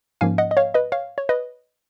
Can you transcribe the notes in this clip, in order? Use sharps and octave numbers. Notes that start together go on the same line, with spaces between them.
G#2 F3 A#3 C#4 F5 G#5
D#5 F#5
D#5
C#5 F5
B4 D#5
C#5 F5
C#5
B4 D#5